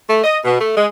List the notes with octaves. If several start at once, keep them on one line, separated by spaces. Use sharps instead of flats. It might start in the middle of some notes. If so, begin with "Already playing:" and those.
A3
D#5
B2
A3
G#3